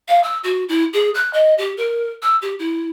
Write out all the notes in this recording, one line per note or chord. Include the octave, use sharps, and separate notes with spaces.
F5
E6
F#4
E4
G#4
F#6
D#5
G4
A#4
E6
G4
E4